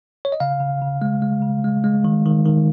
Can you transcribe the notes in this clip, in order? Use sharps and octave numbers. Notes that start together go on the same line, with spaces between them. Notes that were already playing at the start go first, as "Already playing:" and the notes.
C#5
D#5
C#3 F5
C#3
C#3
G#3
G#3
C#3
G#3
G#3
D#3
D#3
D#3